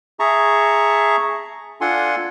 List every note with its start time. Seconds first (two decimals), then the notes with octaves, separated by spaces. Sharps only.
0.20 G#4 E5 A5 A#5 C#6
1.81 D4 F4 A4 F#5 G#5 C6